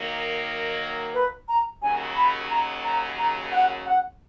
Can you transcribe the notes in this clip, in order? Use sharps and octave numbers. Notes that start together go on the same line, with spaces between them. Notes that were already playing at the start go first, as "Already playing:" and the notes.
Already playing: D#3 F#3 A#3
B4
A#5
D#2 C#3 F#3 G#5
B5
A#5
A#5
A#5
F#5
F#5